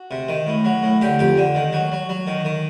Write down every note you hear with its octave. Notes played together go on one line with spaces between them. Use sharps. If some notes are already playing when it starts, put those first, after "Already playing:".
Already playing: F#4
C3
D#3
A2
F#3
A2
D3 G4
F2 G4
D3
D#3
F#3
F#3
F#3
D#3
D#3